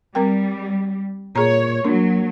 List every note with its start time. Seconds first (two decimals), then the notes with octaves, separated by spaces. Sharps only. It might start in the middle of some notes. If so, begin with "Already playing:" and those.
0.15 G3 C4 A#4 G5
1.36 A#2 G#4 C#5 A#5
1.85 F#3 A#3 D4